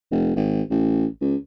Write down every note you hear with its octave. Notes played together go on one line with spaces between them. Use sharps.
F1
G#1
A1
C#2